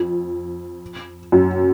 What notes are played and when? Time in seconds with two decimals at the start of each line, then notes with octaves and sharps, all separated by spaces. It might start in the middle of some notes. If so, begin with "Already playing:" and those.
Already playing: F2
1.32 F#2